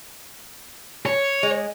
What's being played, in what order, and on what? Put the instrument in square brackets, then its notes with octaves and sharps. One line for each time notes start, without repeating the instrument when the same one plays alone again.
[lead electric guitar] C#5
[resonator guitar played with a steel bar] G#3